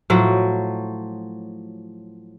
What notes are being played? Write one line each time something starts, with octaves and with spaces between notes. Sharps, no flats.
A2 F3 F#3